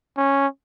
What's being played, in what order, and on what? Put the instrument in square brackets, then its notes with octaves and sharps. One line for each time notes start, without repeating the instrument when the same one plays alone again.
[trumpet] C#4